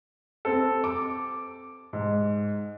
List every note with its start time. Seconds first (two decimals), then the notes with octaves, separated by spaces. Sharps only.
0.45 C4 A4
0.84 D6
1.93 G#2